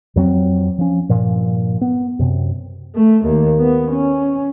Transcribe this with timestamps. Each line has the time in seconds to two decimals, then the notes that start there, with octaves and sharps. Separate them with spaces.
0.16 F2 F#3 C4
0.78 F3 C#4
1.09 G2 A#2 F3
1.81 B3
2.19 F#2 C3
2.95 A3
3.25 D#2
3.59 B3
3.91 C#4